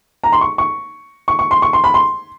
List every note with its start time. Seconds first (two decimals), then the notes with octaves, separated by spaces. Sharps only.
0.24 A#5
0.32 C6
0.41 C#6
0.58 C#6
1.28 C#6
1.39 C#6
1.51 C6
1.62 C#6
1.73 C6
1.84 B5
1.94 C6